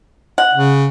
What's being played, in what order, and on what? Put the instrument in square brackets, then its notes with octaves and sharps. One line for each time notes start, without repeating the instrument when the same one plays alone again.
[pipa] F#5
[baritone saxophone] C#3